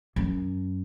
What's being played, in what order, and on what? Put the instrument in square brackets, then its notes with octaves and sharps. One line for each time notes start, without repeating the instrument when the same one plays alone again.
[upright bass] F#2